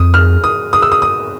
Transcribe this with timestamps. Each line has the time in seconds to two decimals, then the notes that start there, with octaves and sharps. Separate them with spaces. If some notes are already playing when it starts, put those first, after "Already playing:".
Already playing: F2 D#6
0.14 F6
0.44 D#6
0.73 D#6
0.82 E6
0.92 D#6
1.02 D#6